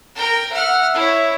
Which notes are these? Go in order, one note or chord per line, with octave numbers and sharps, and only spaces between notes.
A#4 G5
E5 F#5 F6
E4 C#5